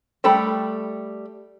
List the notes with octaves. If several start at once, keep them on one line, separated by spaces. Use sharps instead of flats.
G3 A3 A4 G5 B5